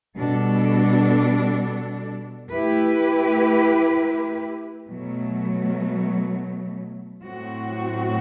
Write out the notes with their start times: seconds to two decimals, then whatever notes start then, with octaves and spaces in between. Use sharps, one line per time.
0.17 B2 G3 D4 A4
2.52 A3 E4 G4 B4
4.88 B2 F#3 A3
7.24 A2 F#3 C4 F#4